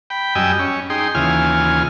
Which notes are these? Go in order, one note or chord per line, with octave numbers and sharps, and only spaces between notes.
G5 B5
F#2 G3 D#5 G5 G#5 E6
C#4
D#4 G#4 G5 C6
D#2 C#3 E3 F4 G#5 F6